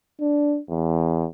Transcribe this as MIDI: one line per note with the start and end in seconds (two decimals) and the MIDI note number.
0.21 0.58 62
0.70 1.25 40